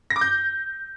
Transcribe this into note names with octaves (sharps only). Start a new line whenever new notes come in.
A#6
D6
G6